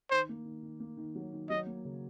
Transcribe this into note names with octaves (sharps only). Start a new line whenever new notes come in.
D#3 C5
A#3
D#3
D#3
A#3
D#3
F#3
D#3
F#3 D#5
A#3
C#3